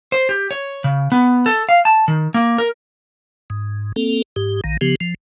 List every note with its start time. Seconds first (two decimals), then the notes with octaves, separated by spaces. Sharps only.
0.12 C5
0.29 G4
0.51 C#5
0.84 C#3
1.12 B3
1.46 A4
1.69 F5
1.85 A5
2.08 D#3
2.34 A#3
2.58 A#4
3.50 G#2
3.96 A#3 C4 A4
4.36 G#2 G4
4.64 A#1 D#3
4.81 C#3 F3 B3 G4
5.00 F3